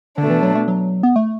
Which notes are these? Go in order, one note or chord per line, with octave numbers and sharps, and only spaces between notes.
B2 D3 A3 D4
E3
F#3
A3
F#3
B3
A3